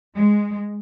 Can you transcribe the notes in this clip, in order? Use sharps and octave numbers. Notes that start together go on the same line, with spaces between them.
G#3